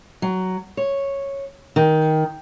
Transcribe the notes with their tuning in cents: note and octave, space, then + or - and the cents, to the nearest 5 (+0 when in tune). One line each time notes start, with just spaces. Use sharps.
F#3 +10
C#5 -5
D#3 +10